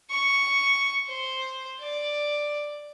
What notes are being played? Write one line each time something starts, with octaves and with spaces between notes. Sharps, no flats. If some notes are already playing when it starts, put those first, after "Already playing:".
C#6
C5
D5